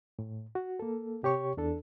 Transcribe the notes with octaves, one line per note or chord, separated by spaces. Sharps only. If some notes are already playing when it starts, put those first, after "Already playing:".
A2
F#4
A#3 A4
C3 G4 C#5 C#6
E2 D4 A4